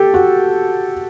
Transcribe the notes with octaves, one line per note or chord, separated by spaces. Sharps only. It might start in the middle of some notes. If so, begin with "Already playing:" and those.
Already playing: G4 A4
F#4